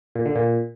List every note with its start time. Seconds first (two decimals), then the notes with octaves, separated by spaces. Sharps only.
0.16 A#2
0.26 D3
0.36 A#2